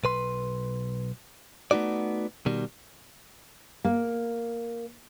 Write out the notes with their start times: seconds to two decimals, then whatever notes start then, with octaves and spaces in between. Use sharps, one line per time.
0.04 B1 B4 C6
1.71 A3 B3 D#4 F#4 D5
2.46 B2 D#3 G3
3.84 A#3